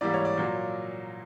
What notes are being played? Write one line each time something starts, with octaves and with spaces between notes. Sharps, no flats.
G#2 E3 G3 A#3 D5
C#5
D5
A#2 F#3 A#3